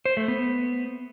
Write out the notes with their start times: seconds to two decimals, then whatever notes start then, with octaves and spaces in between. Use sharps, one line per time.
0.05 C5
0.17 A3
0.28 B3